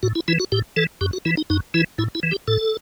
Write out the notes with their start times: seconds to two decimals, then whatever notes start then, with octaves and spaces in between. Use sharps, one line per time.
0.03 A2 F#4
0.15 E4
0.28 E3 E4
0.40 F#4
0.52 A2 G4
0.76 E3 A4
1.01 F#2 G4
1.13 F#4
1.25 E3 E4
1.37 D#4
1.50 F#2 D#4
1.74 E3 E4
1.98 A2 E4
2.15 E4
2.23 E3
2.31 G4
2.48 A2 A4